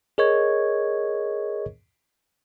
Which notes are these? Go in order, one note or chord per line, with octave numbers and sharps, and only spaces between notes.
G#4 A#4 C#5 D#5 C#6 G#6